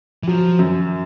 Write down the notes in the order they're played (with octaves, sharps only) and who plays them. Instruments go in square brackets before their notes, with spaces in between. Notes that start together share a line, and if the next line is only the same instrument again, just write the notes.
[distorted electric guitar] E3
[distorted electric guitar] F3 [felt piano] F#3
[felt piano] F#2